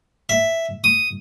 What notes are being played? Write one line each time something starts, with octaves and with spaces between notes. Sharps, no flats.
E5
D#6